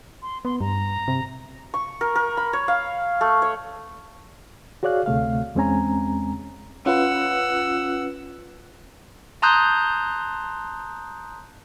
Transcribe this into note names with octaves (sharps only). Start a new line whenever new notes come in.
C6
B3 C6
G2 A#5
C3
C#6
A#4
A#4
B5
C#5
F5
A3
C#5
F#4 G#4 C#5 D5 F5 F#6
D2 C3 A3 F5
E2 G#3 C4 C#4 G#5 A#5
C#4 F4 B4 F#5 E6
A5 A#5 C6 D#6 F#6 G6